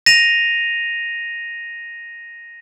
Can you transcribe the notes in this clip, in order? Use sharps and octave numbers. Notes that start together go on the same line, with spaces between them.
A#6 D#7 F7